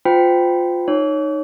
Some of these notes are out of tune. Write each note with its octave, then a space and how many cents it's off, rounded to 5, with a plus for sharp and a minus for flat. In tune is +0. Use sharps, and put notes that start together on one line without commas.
F4 +15 C5 -35 G5 +0
D#4 -10 C#5 +0 D6 -45